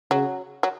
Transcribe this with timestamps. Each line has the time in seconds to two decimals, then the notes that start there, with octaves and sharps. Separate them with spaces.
0.10 C#3 F#3
0.63 F#3